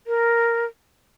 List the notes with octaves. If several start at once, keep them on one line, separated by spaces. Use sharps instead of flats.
A#4